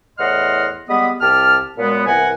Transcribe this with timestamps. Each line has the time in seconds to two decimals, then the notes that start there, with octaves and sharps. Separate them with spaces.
0.19 E2 A2 D#5 F#5 C6 F6
0.89 G3 G#3 B3 B5 D#6
1.21 C2 G4 A5 F6
1.78 A#2 F#3 G#3 B3
2.07 C2 E3 A#4 F#5 G#5